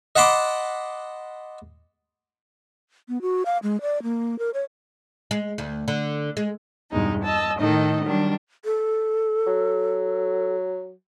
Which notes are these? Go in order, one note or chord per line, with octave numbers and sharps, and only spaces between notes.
D#5 F#5 A5 B5 C6 D6
B3
F#4
F5
G#3
D5
A#3
A#4
C#5
G#3
D2
D3
G#3
E2 G2 B2 G#3 D#4
D#5 A5 E6
A2 D#3 D#4 A4 D#5
D#3 F#3 G3 D4
A4
F#3